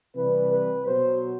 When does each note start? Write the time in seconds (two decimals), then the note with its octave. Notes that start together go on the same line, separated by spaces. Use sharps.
0.15 C3 E3 G3 B4
0.51 B4
0.85 B2 F#3 C5